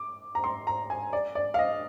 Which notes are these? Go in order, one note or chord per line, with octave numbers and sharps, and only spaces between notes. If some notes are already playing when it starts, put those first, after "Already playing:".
Already playing: D6
A#5
C6
A#5
G#5
D5
D5
F5
D#5